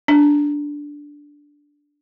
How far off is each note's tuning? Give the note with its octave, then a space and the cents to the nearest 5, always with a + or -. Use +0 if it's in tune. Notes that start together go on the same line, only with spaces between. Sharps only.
D4 -5